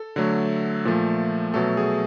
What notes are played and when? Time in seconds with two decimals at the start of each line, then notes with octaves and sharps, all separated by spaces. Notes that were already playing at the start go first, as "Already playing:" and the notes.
Already playing: A4
0.16 D3 F#3 A3
0.85 A#2 F3 A3
1.54 B2 F#3 A3 A4
1.77 G#4